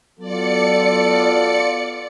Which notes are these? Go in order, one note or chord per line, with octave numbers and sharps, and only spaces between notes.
F#3 B3 F4 A4 D5 C#7